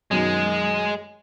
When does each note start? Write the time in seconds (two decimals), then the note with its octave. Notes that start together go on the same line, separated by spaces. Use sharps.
0.11 F#2 B2 D#3 G#3